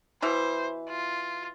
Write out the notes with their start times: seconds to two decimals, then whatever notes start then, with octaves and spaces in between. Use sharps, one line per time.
0.22 B2 E3 B4 C5
0.89 F4